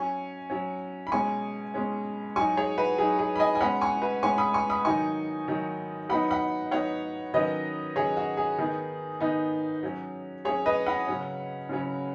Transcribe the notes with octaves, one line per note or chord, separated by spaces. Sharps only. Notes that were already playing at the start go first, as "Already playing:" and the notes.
Already playing: F#3 C#4 G#5 C#6
F#3 C#4
B5
B2 G#3 C#4 G#5 C#6
B2 G#3 C#4
F#3 D#4 G#5 C#6
G#4 C#5
F#4 B4
F#3 D#4 G#4
G#4
B5
D#5 G#5
G#5
B2 G#3 C#4 F#5 B5
G#5 C#6
F#4 B4
B2 G#3 C#4 G#5 C#6
B5 D#6
G#5 C#6
B5 D#6
D#3 F#3 D#4 G#5 C#6
D#3 F#3 D#4
F#3 B3 D#4 F#5 B5
F#5 B5
F#3 B3 D#4 C#5 F#5
D#3 F#3 C#4 B4 D#5
D#3 F#3 C#4 G#4 C#5
F#4
G#4
D#3 B3 D#4 G#4
D#3 B3 D#4
F#3 C#4
F#3 C#4 G#4 C#5
B4 D#5
F#5 B5
C#3 F#3 C#4
C#3 F#3 C#4